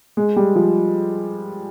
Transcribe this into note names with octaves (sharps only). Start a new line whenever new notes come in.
G#3
G3
F3